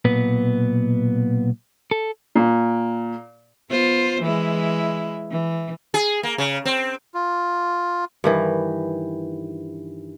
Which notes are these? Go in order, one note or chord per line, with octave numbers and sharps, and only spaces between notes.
B1 A#2 B3 B4
A4
A#2
B3 F4 C5
E3 G#3 E4
E3
G#4
A#3
C#3
C4
F4
G2 D#3 E3